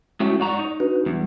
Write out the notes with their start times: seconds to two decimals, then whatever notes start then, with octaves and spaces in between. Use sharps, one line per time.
0.20 G#3 A3 C#4 E4 F#4 G5
0.40 G#2 F#4 D5 A#5 C#6
0.59 D#4
0.80 D4 F#4 B4
1.06 E2 G3